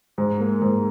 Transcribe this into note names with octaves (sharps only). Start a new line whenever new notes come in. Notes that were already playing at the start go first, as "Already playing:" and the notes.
G#2
A#3
G#2